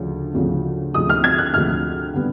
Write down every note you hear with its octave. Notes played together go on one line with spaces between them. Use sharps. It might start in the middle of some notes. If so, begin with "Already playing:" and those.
Already playing: D2 C#3 F3
D2 C#3 F3
D2 C3 F3 G#3 D#6
F6
G#6
F#6
D2 C3 F3 G#3 F6
D3 G3 B3